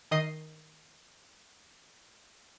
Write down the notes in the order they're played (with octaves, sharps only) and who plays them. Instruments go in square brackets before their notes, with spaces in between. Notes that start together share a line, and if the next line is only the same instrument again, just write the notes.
[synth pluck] D#3 D#5 C7